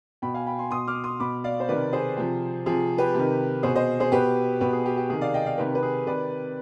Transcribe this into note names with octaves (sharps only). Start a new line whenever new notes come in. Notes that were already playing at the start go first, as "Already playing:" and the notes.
B2 G5 B5
F5 G#5
G5 B5
G#5 C6
B2 C6 D#6
D6 F6
C6 D#6
B2 B5 D6
D5 F5
C5
C3 D#3 B4 D5
G#4 C5
C3 F3
C3 F3 G#4
G4 B4
C3 D#3
B2 G#4 C5
C5 D#5
G#4 C5
B2 G4 B4
B2 G4 B4
G#4
G4
G4
C3 D#3 G#4
D5 F5
D#5 G5
D5 F5
C3 D#3 G4 B4
B4
G#4
C3 D#3 B4 D5